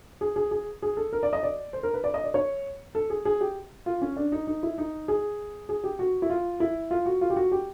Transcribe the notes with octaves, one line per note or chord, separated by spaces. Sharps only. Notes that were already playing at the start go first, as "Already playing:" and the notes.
G#4
G#4
G#4
G#4
A4
A#4
D5
D#5
D5
C5
A#4
B4
D5
D#5
D5
C#5
A4
G#4
G#4
G4
F4
C#4
D4
D#4
D#4
E4
D#4
G#4
G#4
G4
F#4
E4
F4
E4
F4
F#4
F4
G4
F#4
G4